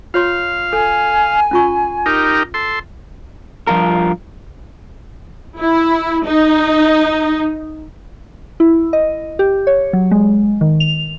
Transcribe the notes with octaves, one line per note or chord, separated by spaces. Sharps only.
F4 C#5 F5 C6
A4 G#5
C#4 F4 C#6
D#4 G4 A#4
A4 C6
G2 F3 F4 A#4
E4
D#4
E4
D#5
G4
C#5
F#3
G#3
D#3
F7